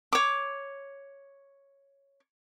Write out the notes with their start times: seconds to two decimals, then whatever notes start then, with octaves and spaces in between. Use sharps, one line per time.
0.13 C#5 D6